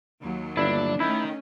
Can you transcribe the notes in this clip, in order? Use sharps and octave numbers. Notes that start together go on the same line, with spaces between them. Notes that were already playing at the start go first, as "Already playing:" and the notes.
D#2 F#3
G1 D4 E4
D#3 A3 C#4 E4